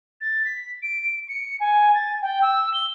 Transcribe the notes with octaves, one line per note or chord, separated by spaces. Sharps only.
A6
B6
D7
C#7
G#5
A6
G5
E6
G7